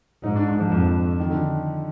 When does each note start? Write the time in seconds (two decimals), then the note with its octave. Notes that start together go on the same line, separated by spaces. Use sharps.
0.24 G#2 D#4
0.36 D4
0.48 D4
0.60 F3
0.71 F2 F3
1.20 D#3
1.30 D3